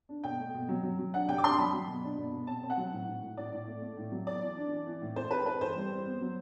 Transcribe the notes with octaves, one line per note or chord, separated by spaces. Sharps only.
D4
B2 G5
A3
B2
F#3
F#3
F#3
D4 F#5
C3 G5
D6
D4 C6
F#3 B5
F#3
B2
D4
B2
B2
C4 A5
C4
F#5
F#3
A2
A2
A2
A2 D5
A2
A3
A3
A2
F#3
B3 D5
E3
D4
E3
E3
A2
E3 C5
C4 B4
E3 B4
E3 C5
G3
C4
B3
F#3